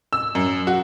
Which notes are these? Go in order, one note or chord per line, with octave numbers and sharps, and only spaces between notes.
E6
F#2
F#4